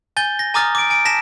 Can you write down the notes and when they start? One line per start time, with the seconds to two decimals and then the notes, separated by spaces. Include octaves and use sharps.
0.17 G#5 G6 A6 G7
0.39 A#6
0.54 G#5 A#5 D6 D#6 F6 A6
0.75 D6 D7
0.90 G#5 D7
1.05 A5 A#6 B6 E7